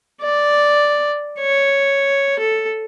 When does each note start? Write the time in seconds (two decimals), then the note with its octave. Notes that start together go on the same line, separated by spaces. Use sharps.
0.22 D5
1.40 C#5
2.39 A4